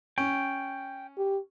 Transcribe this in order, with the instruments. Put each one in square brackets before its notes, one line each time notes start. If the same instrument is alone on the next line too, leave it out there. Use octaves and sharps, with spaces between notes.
[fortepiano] C#4 [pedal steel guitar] G5
[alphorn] G4